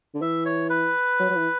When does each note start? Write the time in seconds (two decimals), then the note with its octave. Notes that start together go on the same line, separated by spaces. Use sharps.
0.14 D3
0.21 E3 E5
0.45 C#5
0.70 B4
1.19 F#3
1.30 F#3
1.36 E3